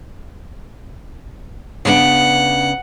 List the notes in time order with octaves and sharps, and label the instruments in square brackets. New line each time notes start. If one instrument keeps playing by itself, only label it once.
[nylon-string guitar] C#3 B3 D4 [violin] F#5